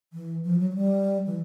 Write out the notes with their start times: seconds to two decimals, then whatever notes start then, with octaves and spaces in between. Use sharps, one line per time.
0.13 E3
0.44 F3
0.59 F#3
0.71 F#3
0.75 G3
1.26 E3